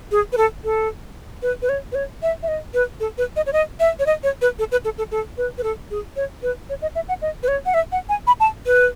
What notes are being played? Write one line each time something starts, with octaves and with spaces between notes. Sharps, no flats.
G#4
B4
A4
A4
B4
B4
C#5
B4
C#5
E5
E5
D#5
B4
A4
B4
D#5
C#5
D#5
E5
C#5
D#5
C#5
B4
A4
B4
A4
A4
A4
B4
B4
A4
G#4
C#5
B4
C#5
D#5
E5
F#5
D#5
B4
C#5
F#5
E5
F#5
G#5
B5
A5
B4